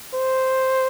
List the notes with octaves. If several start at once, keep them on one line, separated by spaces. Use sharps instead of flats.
C5